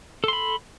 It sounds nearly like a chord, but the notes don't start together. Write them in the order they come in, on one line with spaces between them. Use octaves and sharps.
A4 C6 B5